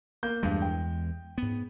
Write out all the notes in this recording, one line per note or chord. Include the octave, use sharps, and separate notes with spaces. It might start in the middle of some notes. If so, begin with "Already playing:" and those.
A#3 G6
E2 G2 G#3
G5
G#2 B3